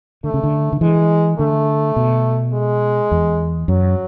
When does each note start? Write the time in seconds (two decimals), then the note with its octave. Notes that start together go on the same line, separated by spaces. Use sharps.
0.24 D3 A3
0.34 C#3
0.44 D3
0.73 D3
0.81 E3 G#3
1.39 D3 A3
1.96 B2
2.54 G#3
3.11 E2
3.68 F#2 F#3